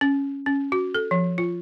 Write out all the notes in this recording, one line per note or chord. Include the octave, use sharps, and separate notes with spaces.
C#4
C#4
F#4
A4
F3
F4